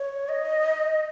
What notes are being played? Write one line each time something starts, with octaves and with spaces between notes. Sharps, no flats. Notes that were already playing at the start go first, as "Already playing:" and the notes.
Already playing: C#5
D#5